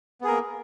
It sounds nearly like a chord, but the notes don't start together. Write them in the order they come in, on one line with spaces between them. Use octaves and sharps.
B3 G#4 A#4 A#3